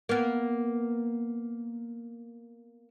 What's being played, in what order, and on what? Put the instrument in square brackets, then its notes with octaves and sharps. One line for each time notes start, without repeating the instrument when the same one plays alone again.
[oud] A#3 B3